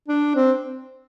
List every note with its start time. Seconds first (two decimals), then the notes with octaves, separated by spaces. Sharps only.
0.08 D4
0.35 C4